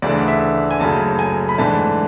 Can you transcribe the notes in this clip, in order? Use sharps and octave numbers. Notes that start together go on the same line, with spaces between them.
D2 C#3 E3 A3 D4 D5
E5
G#5
F#1 F#2 C#3 F#3 A3 A5
G#5
B5
G#2 E3 A3 D4 A5